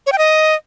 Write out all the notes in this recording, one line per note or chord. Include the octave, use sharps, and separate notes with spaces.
C#5
G5
D#5